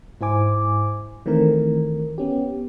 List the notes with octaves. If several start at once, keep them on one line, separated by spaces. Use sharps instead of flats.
G#2 E4 C5 G#5 D6
D#3 E3 A3 C4 A#4
B3 C#4 G4